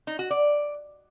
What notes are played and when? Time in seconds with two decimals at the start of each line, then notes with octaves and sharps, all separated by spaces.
0.07 D#4
0.19 F#4
0.30 D5